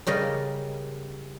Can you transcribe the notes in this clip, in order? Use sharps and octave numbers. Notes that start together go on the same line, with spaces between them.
C#3 G3 A#4 D#5